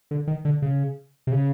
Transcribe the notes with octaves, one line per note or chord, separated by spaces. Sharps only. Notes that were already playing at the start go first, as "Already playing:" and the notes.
D3
D#3
D3
C#3
C3
C#3